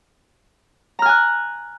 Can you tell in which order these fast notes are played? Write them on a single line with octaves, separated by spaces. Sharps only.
A#5 F6 G#5 F#6